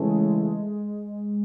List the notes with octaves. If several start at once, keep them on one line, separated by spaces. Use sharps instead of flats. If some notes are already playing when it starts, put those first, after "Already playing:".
Already playing: C#3 E3 G#3 A3 C#4